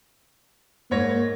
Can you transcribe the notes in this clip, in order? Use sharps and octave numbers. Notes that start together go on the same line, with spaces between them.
G#2 A#3 C#5 A#6